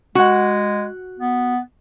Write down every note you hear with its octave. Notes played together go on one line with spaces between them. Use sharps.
G#3 F#4 F#5
B3